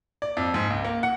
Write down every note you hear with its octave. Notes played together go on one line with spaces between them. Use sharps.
D5
F2
G#2
C#2
A#3
F#5